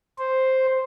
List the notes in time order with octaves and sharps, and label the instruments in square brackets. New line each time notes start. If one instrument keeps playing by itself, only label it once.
[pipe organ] C5